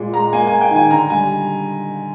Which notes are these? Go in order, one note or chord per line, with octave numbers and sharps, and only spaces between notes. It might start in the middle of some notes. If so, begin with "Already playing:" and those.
Already playing: A#2 G#3
G#3 A#5
A#3 G#5
A#3 G#5
G5
D#3 G#5
D3 A#5
G3 G#5